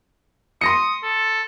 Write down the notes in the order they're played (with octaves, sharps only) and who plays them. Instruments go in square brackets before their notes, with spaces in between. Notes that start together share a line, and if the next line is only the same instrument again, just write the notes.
[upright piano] C6 A#6 C#7 [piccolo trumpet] D#6
[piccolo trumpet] A4